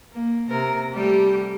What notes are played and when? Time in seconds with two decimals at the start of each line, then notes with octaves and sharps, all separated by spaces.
0.13 A#3
0.50 C3 A#4
0.94 G3 A3 G4